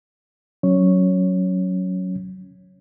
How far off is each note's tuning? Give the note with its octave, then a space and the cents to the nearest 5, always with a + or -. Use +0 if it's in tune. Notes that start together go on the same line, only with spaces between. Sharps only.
F#3 +0 C#4 +0 C#5 +0